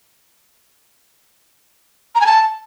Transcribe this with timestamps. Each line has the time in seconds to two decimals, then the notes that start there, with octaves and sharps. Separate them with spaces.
2.15 A#5
2.21 G#5
2.26 A5